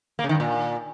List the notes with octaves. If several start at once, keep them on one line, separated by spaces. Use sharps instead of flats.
A#3
C#3
D#3
G2
A#2